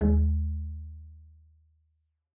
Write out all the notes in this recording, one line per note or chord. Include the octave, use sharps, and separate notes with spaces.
D#2 G#3